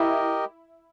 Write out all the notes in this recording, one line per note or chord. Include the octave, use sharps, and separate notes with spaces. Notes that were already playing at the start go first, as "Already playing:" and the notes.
Already playing: E4 G4 A#4 D#5